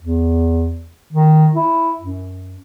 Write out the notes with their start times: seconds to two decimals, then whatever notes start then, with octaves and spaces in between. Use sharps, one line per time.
0.02 E2
1.13 D#3
1.55 E4
1.99 F#2